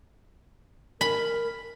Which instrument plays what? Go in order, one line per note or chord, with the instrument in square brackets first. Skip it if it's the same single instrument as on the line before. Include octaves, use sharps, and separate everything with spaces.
[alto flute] A#4 [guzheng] B5